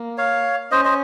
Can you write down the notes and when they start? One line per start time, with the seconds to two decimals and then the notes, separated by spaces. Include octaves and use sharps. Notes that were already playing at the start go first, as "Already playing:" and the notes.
Already playing: A#3
0.18 C#5 F5
0.71 C#4 C5 D#5
0.85 C5 D#5